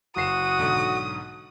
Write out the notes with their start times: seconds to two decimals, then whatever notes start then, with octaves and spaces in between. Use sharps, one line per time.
0.16 F#1 F#4 D#6 C7 E7
0.59 B1 G#2 D3